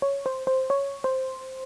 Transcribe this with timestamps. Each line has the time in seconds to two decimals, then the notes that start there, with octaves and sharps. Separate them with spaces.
0.02 C#5
0.26 C5
0.47 C5
0.70 C#5
1.04 C5